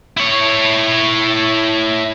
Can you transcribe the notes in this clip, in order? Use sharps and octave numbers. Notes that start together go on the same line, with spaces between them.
E4 C#5